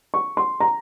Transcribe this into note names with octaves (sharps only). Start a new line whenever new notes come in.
C#6
C6
A#5